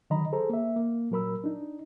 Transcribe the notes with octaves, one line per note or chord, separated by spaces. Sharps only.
D3 D#3 F#3 D#5 A#5 B5
G#4 A4 C5 A#5
A#3 E5
A#3
A#2 F#3 A#4 B5 E6
D4 D#4